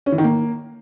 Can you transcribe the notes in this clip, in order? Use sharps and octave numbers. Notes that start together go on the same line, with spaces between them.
C#4
E3
D#3
A#3